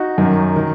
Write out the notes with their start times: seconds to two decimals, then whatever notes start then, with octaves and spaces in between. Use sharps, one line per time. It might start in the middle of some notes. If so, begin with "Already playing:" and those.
Already playing: D#4 F#4
0.18 F#2 D#3
0.56 D#3